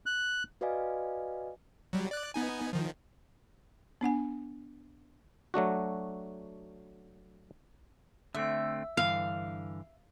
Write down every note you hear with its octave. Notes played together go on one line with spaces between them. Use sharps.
F#6
F#4 B4 D5 D#5 F5 G#5
F#3 G3
D5 F#6
B3 D#4 G#5
D#3 F3
B3 D4 F#5 G#5
F#3 A3 D4 F#4
D3 A3 C4 E5
G2 D3 E3 F5